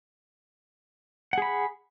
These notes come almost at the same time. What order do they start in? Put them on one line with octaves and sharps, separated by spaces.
F#5 G#4 B5